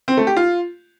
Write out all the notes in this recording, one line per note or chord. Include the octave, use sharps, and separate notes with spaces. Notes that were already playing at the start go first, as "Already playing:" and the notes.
C4
A3
G4
F4